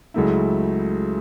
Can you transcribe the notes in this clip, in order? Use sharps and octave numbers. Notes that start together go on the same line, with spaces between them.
C#2 C#3 F#3 A3 E4